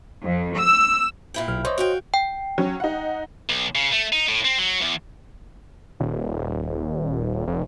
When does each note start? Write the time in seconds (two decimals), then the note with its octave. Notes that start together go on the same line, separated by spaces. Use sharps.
0.22 F2
0.58 E6
1.34 A#2 E4 G5
1.48 B1 F6
1.65 E3 C5 C#5 D#5
1.78 F#4 F5 G5
2.14 G5
2.58 F#3 C#4
2.80 D#4 F#5
3.49 B1
3.75 C#3
3.92 A3
4.13 D#4
4.28 A2
4.45 C4
4.58 F#3
4.82 E2
6.00 D#1
7.47 F1